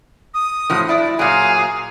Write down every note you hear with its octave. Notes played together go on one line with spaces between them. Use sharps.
D#6
A2 F3 F#3
E4 D5
A#2 F#3 G#4 F5